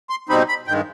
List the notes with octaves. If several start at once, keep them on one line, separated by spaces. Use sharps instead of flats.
C6
B2 G3 C4 D#4 B5
B5
G2 D#3 G#3 G5